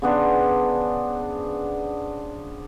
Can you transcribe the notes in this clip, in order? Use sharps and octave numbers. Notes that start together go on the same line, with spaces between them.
C#3 B3 D4 C5